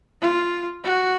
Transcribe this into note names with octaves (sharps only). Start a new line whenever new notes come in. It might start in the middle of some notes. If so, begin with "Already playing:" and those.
F4
F#4